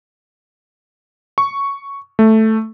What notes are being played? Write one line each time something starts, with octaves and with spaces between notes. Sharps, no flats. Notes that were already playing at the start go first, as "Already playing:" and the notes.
C#6
A3